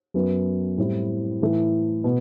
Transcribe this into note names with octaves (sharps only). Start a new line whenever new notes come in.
F#2 F#3 B3
A2 G3 C4 E4
A2 E3 A3
B2